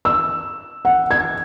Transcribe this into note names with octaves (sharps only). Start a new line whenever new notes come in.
E6
F#5
G#6